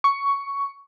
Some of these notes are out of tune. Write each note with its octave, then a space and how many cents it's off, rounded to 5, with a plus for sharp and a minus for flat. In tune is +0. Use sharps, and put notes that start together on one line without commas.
C#6 +10